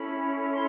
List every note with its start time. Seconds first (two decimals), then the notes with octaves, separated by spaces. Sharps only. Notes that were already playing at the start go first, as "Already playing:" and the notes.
Already playing: C#4 E4 A4 C#5 B5
0.52 C6